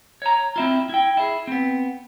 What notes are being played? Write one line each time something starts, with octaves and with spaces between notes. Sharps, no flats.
C#5 A#5
C4 E4 F4
E4 G5
E4 G#4
B3 C4